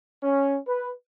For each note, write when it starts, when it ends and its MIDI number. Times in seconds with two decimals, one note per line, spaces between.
0.23 0.57 61
0.66 0.92 71